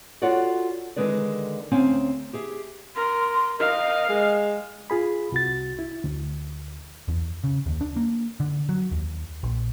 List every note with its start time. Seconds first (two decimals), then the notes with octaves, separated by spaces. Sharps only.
0.22 F4 F#4 A4 C#5 D5 F#5
0.96 D3 D#3 G#3 B4 D5
1.71 D2 C4 C#4 F5 G#5
2.33 G4 G#4 E5
2.96 A#4 C6
3.60 A#4 D#5 F5
4.09 G#3
4.90 F4 G#4 B5
5.32 C2 F#4 A6
5.79 E4
6.04 D2
7.08 E2
7.44 C#3
7.66 D#2
7.81 D4
7.96 A#3
8.40 D3
8.69 F#3
8.91 D#2
9.43 A#1